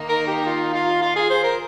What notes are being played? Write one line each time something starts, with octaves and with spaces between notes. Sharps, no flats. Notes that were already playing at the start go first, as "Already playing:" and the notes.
Already playing: D#3 A#3 D#4
A#4
G4
F4
F4
F4
G#4
C5
A#4